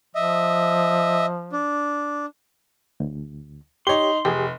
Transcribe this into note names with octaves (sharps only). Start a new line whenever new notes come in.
F3 D#5 E5
D4
D2
D#4 G4 C#5 C6 G7
F1 G4 G#4